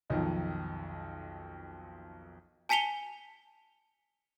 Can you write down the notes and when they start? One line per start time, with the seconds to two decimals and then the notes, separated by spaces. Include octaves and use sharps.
0.10 B1 F2 D#3
2.69 G#5 A5 B6 C#7 F7 G7